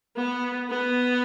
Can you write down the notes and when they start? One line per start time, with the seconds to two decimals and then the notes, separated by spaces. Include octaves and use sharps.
0.16 B3
0.70 B3